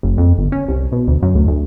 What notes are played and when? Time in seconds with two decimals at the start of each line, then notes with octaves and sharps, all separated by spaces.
0.03 F#1
0.18 F2
0.38 G1
0.52 C#4
0.68 C2
0.92 B2
1.08 D2
1.22 F#2
1.35 D2
1.47 D2